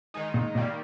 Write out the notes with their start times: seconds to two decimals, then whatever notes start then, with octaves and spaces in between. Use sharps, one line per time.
0.14 D#3 G#3 D#4
0.34 A#2
0.55 A#2 D#3 G3 A#3